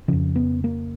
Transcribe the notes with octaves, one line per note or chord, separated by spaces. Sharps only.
F2 C#3 F3
B3
A#3